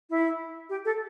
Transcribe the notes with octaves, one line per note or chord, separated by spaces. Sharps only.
E4
G4
A4